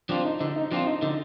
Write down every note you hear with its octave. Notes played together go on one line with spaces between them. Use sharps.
F3 C4 D4 F4
D#4
D3 D#4
D#4
F3 C4 D4 F4
D#4
D3 D#4